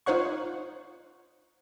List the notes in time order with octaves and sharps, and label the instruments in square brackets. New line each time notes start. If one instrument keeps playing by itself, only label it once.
[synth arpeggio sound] D#4 F4 C5 C#5 F#5 C#6